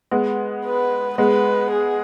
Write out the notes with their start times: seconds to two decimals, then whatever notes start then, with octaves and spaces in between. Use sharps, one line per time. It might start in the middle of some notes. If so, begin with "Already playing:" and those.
0.11 G#3 B3
0.65 B4
1.18 G#3 B3 B4
1.72 G#4